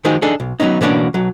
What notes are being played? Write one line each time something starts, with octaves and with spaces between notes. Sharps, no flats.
D#3 F3 G#3 D#4 F#4 G#4
D4 D#4 G#4 A4
B1
F#3 G#3 B3 C#4 D#4
B2 E3 A#3 C#4 D4 F#4
B1 F#3